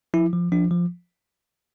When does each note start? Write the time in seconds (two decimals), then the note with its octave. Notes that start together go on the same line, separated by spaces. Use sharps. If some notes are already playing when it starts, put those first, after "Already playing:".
0.14 F3 E4
0.33 F3
0.52 F3 D4
0.71 F3